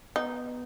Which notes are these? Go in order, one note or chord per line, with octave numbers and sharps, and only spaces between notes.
B3 D#4